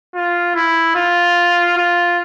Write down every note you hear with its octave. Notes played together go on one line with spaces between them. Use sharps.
F4
E4
F4
F4